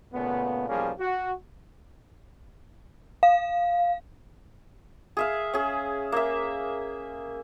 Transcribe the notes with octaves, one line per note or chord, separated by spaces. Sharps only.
A#2 C#3 A3 B3
B1 F3 G3 A#3 C#4 G#4
F#4
F5
G#4 E5 F5
C#4 G#4
A#3 E5